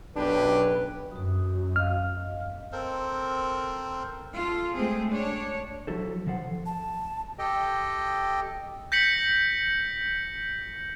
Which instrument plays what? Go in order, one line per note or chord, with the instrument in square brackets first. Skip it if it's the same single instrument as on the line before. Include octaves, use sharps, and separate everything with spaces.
[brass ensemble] B1 F#2 G4 [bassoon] D4 [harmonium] B4
[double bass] F#2 [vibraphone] F#4 D#6
[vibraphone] D#5 F5 [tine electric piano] F6
[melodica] C4 A4 A#4 C5
[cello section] F4 A4
G#3 A3 C4 G#4
D4 C#5
[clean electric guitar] F3 F#3 E4 F#4 A4 C5
D#3 F3 A4 C5 F#5
[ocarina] A5
[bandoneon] G4 A4 D#5 G5
[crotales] G6 A#6 B6 C#7 F#7